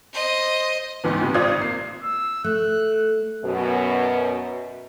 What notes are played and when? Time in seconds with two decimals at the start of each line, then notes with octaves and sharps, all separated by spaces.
0.13 C5 D#5
1.04 C#2 G#2 E3 B3
1.21 A2 C3
1.34 G#1 C4 F4 D5 D#6 G#6
1.59 A#3 C7
2.04 E6
2.44 A3 F#6
3.44 F#2 B2